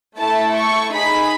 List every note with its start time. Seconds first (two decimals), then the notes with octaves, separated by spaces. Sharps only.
0.18 A3 E4 A4 A5
0.55 C#6
0.92 D#4 G#4 B5